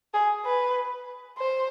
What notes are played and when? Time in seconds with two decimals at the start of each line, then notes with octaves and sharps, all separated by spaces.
0.14 G#4
0.45 B4
1.38 C5